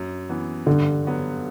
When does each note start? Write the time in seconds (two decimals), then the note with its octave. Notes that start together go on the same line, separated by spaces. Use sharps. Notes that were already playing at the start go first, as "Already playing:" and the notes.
Already playing: F#2
0.29 E3 B3
0.66 G2 D3
1.05 F#3 B3 F#4